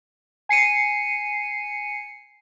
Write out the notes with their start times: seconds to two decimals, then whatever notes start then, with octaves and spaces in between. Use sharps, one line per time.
0.49 G#5 C7 C#7 D#7